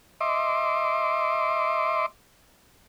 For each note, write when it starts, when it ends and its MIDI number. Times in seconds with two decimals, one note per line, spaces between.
0.21 2.06 75
0.21 2.06 76
0.21 2.06 84
0.21 2.06 86